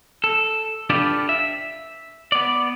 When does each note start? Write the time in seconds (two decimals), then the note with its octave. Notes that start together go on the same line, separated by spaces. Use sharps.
0.24 A4
0.90 D4 F4 G4 A4 B4 D5
1.29 E5
2.32 B3 D5